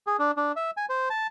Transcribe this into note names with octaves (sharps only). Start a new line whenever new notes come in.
G#4
D4
D4
E5
G#5
C5
A5